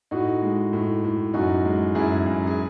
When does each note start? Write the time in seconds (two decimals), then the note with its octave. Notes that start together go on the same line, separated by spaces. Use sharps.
0.11 A2 D#4 F#4
0.42 G#3
0.73 A2
1.04 A2
1.34 F#2 D#4 F#4
1.65 G#3
1.95 F#2 E4 G#4
2.26 F#2
2.47 G#4